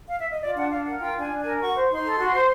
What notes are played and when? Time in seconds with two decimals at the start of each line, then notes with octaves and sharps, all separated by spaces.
0.08 F5
0.18 E5
0.29 D#5
0.41 F4 D5
0.55 D4 F#5
0.70 D4 F5
0.85 A#4 F#5
1.00 F4 G5
1.15 D4 G#5
1.30 D4
1.39 A#4 G#5
1.59 F#4 C#6
1.75 C5
1.89 D#4 C6
2.04 A4
2.18 F#4
2.34 C5